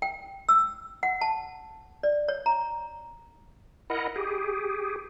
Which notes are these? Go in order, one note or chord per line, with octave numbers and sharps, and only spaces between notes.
G5
E6
F#5
A5
D5
C#5
A#5
E4 A#4 D#5 F#5
G4 G#4